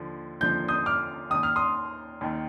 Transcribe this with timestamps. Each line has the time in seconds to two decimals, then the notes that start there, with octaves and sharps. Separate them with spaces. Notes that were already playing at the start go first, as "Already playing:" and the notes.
Already playing: D#2 D3 F3
0.41 D#2 D3 F3 G6
0.68 D#6 G6
0.86 D6 F6
1.30 D#2 D#3 D#6
1.43 F6
1.56 C6 D#6
2.21 D#2 D#3